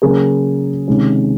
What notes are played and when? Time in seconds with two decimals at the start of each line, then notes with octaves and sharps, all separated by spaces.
0.02 C#3 F#3 A#3 C#4 G#4 A#4
0.88 C3 D#3 G#3 C#4